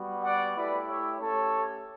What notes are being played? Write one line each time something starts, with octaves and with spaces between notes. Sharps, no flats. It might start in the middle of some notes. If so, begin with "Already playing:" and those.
Already playing: G3 B3 F#4
D5 F#5
A3 E4 G4 B4 D5
C#5 E5
A3 C#4 G4 A4 C#5